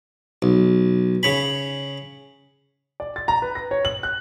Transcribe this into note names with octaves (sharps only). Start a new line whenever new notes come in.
B1
C#3 C#5 B5
D5
A6
A#5
B4
A#6
C#5
F#7
F#6